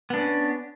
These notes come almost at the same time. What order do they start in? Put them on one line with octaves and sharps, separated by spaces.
B3 D4 C#4